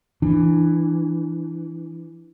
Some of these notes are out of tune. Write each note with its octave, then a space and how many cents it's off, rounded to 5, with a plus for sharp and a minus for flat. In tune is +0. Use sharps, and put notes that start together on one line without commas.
E3 +5 D4 +20